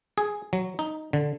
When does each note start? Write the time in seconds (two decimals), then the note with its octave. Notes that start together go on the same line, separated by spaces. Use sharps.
0.18 G#4
0.53 F#3
0.79 D#4
1.13 D3